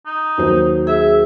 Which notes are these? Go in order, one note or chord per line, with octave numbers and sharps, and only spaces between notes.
D#4
D#2 F#3 C5
G#4 E5